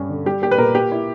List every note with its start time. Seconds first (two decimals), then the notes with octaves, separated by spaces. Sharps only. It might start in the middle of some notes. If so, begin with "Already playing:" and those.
Already playing: G2 G3 C#4
0.09 D3
0.26 G3 G4
0.42 A#3 G4
0.51 B4
0.58 A#2 A#4
0.75 A#3 G4
0.92 E4